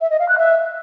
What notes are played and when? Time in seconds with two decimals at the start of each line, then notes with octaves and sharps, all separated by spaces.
0.01 E5
0.10 D#5
0.19 F5
0.29 F#6
0.38 E5